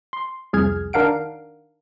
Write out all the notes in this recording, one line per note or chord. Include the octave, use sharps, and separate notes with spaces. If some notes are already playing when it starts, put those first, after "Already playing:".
C6
C2 F2 G#4 F6 G#6
D#3 D4 A#4 F5 F#5 D7